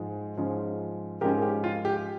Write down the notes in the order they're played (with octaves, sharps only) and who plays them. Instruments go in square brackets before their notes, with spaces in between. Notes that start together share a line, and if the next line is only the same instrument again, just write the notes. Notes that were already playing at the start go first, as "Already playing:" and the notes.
Already playing: [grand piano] G#2 F3 G#3
G#2 F3 G#3 C#4
G#2 F3 G#3 C#4 G4 A#4
G4
F4
G4